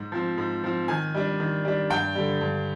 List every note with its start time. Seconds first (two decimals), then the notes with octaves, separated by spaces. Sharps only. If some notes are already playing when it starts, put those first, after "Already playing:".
Already playing: G#2
0.12 F3 C4
0.38 G#2
0.63 F3 C4
0.88 D#3 G#5
1.15 G3 D4
1.40 D#3
1.65 G3 D4
1.90 G2 G5
2.15 D3 G3
2.41 G2